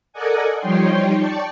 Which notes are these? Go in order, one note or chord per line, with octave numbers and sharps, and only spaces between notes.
A4 A#4 D5 D#5 F#5 G#5
F3 G3 D#4 C#5 G5 C6
D5 G5 A5 C#6